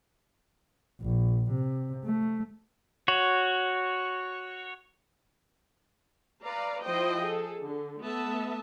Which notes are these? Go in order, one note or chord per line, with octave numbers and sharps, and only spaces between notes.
A#1
C3
A3
F#4 C#5
B4 D5 F5 A#5
F3 E4 C5 D#5 G5
G#4 A4
D3
A3 B3 E5 A5